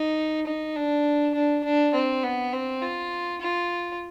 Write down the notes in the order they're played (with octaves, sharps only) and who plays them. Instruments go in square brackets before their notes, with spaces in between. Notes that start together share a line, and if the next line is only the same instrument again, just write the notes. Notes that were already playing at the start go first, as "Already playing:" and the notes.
Already playing: [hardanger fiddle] D#4
D#4
D4
D4
D4
C4
B3
C4
F4
F4